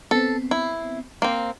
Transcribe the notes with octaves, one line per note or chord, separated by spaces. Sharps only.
B3 C4 A4
E4
A#3 C4